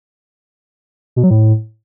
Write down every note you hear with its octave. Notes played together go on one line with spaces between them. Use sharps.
B2
F#3
A2